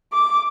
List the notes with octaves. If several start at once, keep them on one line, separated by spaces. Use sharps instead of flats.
D6